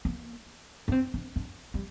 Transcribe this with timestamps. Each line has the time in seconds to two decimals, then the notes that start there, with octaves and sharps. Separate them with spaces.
0.05 A#3
0.88 D4
0.92 C4
1.14 D4
1.36 D4
1.74 G3